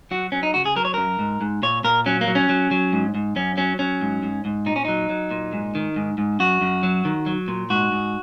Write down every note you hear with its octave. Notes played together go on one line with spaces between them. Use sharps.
F#3 F#4
F#3 C#4
D#4
C#3 F#4
G#4
F#3 A#4
C#5
F#2 A#4
G#2
G#2
A#2 C#5
A#2 A#4
F#3 C#4
A#3
F#3
C#4
F#3
F#3
G#2
G#2
F#2 C#4
F#3 C#4
F#3 C#4
G#2
G#2
G#2
A#2 D#4
C#4
F#3 D#4
F#3
A#2
G#2
D#3
G#2
G#2
F#2 F#4
F#2
F#3
D#3
F#3
A#2
G#2 F#4
G#2